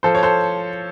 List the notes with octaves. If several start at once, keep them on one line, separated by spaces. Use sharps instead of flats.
F3 A4 C5
C#5
A4 C5